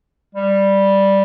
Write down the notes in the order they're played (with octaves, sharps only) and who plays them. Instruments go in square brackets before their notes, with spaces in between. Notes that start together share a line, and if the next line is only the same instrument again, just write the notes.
[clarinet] G3